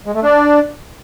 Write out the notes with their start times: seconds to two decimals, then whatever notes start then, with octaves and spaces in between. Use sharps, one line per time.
0.06 G#3
0.14 A3
0.23 D4